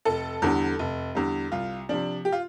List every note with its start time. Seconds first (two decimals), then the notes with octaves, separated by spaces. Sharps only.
0.05 F1 A4
0.42 E2 D3 G3
0.79 F1
1.15 E2 D3 G3
1.52 C2 F4
1.89 C3 F3 D4
2.25 G4
2.32 F4